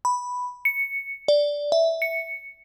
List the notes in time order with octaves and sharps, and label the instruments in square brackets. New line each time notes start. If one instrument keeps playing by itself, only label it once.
[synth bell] B5
C#7
D5
E5
C#7